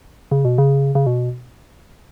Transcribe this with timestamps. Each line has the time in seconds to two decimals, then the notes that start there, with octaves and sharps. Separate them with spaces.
0.31 C#3
0.45 B2
0.58 C#3
0.95 C#3
1.07 B2